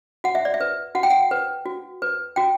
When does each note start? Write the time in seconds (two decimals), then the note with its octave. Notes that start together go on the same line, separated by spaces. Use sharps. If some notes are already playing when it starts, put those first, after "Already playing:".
0.24 F#4 F#5
0.35 E5
0.45 D5
0.54 E5
0.60 B4
0.95 F#4 F#5
1.03 G5
1.10 F#5
1.31 B4
1.66 F#4
2.02 B4
2.36 F#4 G5